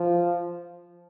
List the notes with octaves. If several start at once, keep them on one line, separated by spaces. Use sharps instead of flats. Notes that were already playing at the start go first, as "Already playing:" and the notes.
Already playing: F3